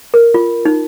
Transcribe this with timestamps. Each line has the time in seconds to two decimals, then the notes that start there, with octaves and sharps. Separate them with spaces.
0.14 A#4
0.34 F4
0.65 D#4